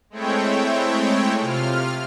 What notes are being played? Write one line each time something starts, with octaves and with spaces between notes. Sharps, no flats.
G#3 A3 C4 E4 C#5 G5
C3 F4 F6